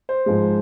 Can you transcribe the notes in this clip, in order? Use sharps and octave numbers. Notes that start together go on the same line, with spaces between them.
C5
G#2 F3 G#3